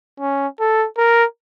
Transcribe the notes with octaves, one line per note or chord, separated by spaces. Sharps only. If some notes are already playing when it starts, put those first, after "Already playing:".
C#4
A4
A#4